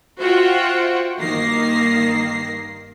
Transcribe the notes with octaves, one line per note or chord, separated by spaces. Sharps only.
F4 F#4 C5 E5 F#5 G5
G2 D#3 A#3 A#6 C7